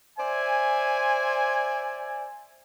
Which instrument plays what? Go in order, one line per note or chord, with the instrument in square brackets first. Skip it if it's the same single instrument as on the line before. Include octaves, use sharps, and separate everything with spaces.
[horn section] C5 D5 E5 G#5